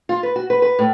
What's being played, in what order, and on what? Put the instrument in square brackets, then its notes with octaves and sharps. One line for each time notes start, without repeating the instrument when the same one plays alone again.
[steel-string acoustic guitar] F4
B4
F#4
B4
B4
A2